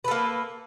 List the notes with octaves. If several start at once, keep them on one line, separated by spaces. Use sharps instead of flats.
A#3 A4 B4